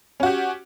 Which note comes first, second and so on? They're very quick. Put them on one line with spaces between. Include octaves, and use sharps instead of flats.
C#4 F#4 G4